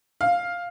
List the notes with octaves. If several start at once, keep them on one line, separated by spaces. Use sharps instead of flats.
F5